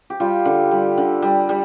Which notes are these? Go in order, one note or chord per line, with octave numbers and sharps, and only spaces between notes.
G4
G3 F4
D3
G3
D3
G3
G3